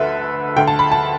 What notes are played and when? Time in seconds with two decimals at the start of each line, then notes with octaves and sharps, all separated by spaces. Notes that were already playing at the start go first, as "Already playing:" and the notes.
Already playing: D2 D3 A4 B4 E5
0.57 D2 D3 G5
0.67 A5
0.79 B5
0.92 A5